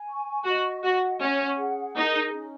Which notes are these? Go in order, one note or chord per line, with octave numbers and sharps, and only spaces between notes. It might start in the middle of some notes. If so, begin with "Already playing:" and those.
Already playing: G#5
C#6
F#4 D#5
F#4 F#5
C#4 F#5
G#4
D#4 A#4
C#4